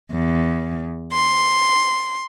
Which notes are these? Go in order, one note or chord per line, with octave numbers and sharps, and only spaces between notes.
E2
C6